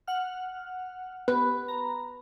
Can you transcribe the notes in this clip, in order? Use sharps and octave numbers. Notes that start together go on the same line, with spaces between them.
F#5 F6
B3 G4 B4
A#5